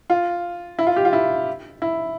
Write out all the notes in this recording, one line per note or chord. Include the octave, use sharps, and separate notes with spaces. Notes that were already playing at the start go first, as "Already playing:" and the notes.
F4
E4
F4
G4
F4
E4
E4